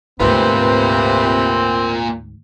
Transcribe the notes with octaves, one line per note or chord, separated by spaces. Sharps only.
D2 G#2 C3 A#3 C4 F4 B4